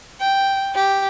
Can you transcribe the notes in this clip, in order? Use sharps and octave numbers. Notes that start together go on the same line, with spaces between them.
G5
G4